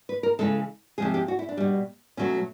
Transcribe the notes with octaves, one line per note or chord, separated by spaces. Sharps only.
B4
A#4
C#3 E3 G#3 A4
C3 F3 G#3 G#4
G4
F#4
E4
D4
B2 G3
B2 F#3 A3 C#4